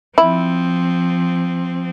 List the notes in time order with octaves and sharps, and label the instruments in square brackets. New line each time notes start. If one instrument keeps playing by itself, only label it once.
[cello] F3 C4 [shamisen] E4